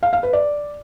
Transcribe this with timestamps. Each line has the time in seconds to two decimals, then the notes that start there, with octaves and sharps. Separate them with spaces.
0.03 F5
0.13 F5
0.23 B4
0.33 D5